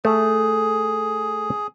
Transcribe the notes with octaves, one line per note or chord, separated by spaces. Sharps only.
A3 G#4